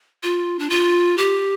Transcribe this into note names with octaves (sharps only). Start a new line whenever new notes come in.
F4
D4
F4
G4